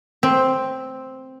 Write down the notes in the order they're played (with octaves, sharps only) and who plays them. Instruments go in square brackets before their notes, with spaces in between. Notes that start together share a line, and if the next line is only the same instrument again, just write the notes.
[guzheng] C4